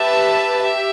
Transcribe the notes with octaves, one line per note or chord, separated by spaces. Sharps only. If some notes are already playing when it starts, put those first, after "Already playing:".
Already playing: G4 B4 E5 A5
G4 E5